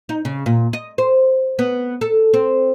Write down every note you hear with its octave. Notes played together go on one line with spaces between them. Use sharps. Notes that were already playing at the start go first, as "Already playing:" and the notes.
D#4
C#3
A#2
D#5
C5
B3
A4
C4